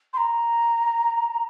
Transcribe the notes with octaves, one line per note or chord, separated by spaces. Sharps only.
C6
A#5